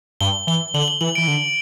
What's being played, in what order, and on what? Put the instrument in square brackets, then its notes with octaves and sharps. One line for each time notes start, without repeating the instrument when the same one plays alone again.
[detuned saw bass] G2 [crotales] G7
[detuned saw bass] E3 [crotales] G7
[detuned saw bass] D3 [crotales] F#7
[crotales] G7
[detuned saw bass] E3 [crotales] F#7
[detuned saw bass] E3 [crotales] D7
[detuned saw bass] D3